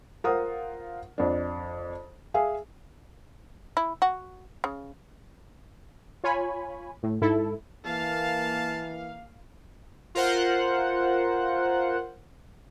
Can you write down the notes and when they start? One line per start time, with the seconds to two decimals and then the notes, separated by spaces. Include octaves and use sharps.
0.24 F4 A#4 C5 F5 F#5 D#6
1.18 F2 D4
2.34 G#4 E5 F5 G#5
3.77 E4
4.02 F#4
4.64 C#3
6.24 F4 C#5 G#5 B5
7.03 A2
7.22 G#2 E4 A4
7.85 E3 A#3 F5 A5
10.15 F4 A#4 C5 F#5